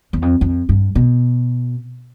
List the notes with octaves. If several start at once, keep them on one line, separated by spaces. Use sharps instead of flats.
E2
F2
F2
G2
B2